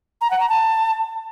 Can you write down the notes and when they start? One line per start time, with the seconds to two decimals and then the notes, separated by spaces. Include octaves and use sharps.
0.21 A#5
0.31 F#5
0.40 A#5
0.49 A5